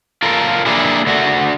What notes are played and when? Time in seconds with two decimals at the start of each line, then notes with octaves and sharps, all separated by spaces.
0.22 F4 A4 A#4
0.66 A#3 D4 E4 G4 G#4
1.07 D3 A3 F#4